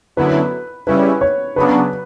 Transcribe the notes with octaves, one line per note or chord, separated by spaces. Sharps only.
F#2 D3 F#3 B3 E4 B4
C#3 G3 C#4 E4 B4
C#5
C#3 F#3 B3 D4 B4